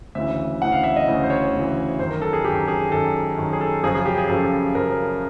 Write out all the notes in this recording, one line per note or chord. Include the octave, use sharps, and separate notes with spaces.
D2 C#3 E3 E5
D2 C#3 E3 F#5
F5
E5
D#5
D2 C#3 E3
C5
C#5
D2 C#3 E3
F#2 D#3 C5
A#4
A4
G#4
F#2 D#3 G4
G#4
F#2 D#3 A4
F#2 D#3
G#4
A4
F#2 C#3 F3 G#4
G#4
G4
G#4
F#2 C#3 F3 A4
F#2 C#3 F3 A#4